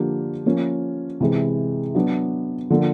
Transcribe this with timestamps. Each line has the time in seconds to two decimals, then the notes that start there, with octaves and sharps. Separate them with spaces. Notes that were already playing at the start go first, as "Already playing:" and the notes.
Already playing: D3 F3 A#3 D4 G4
0.45 F3 A#3 C#4
1.20 C3 E3 G#3
1.95 F#3 B3 D4
2.70 D3 F3 A#3